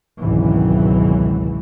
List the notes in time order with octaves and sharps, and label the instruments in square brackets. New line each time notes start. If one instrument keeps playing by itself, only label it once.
[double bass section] G#1 C#2 B2 D#3 E3 F#3